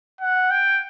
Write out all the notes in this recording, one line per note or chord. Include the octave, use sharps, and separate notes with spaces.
F#5
G5